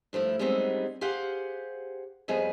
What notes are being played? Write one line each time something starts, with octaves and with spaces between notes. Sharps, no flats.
G2 F3 A3 E4
F#2 G3 G#3 B3 C4 D#4
G4 G#4 C5 F5 F#5
F2 F3 G3 B3 G#4 D#5